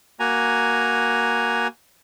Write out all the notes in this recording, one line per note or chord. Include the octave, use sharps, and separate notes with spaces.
A#3 F#4 G#5 A#5